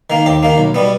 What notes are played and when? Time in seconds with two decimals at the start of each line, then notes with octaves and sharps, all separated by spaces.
0.10 D#3 A#3
0.26 D#2 G4
0.43 D#3 A#3
0.58 B1
0.74 B2 G3 B3